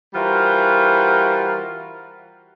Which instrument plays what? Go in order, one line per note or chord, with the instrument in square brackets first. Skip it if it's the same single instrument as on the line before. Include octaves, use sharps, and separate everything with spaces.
[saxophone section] E3 G3 F4 F#4 A#4 C5